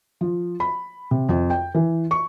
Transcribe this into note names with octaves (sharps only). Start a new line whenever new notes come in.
F3
B5
C3
F2
G5
E3
C#6